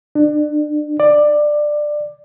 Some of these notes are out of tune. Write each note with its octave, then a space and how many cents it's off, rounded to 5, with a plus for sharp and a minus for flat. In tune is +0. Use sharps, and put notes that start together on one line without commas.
D4 +30
D5 +15